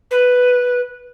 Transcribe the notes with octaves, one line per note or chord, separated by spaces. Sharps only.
B4